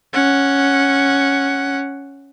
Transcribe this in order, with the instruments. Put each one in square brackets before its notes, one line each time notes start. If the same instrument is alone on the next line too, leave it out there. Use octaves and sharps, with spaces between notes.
[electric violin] C#4 F#5